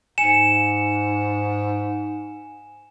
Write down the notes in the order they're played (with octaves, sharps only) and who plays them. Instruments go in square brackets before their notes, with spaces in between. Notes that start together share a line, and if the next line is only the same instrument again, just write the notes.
[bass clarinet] G#2 [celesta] G#5 C#7 [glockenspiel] E7